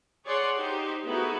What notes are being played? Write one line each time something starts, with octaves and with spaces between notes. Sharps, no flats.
G#4 C#5 D5 F#5 C6
D#4 G4 C5
G#3 A3 B3 D#4 E4 F#4